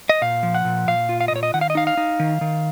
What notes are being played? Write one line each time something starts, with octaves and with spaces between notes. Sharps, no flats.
D#5
A#2 F5
F3
F#5
A#2
A#2 F5
F4
F5
D#5
A#2 C#5
D#5
D#3 F#5
F5
D#5
D#4 F5
F5
D#4
D#3
D#3